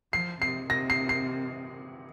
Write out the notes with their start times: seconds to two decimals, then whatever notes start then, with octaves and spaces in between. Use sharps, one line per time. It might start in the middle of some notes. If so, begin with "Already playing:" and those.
0.13 F3 C7
0.42 C3 C7
0.70 C3 A#6
0.90 C7
1.09 C7